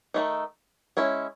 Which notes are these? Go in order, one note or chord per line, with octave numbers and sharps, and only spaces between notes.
D#3 A3 D#4
G#3 C#4 E4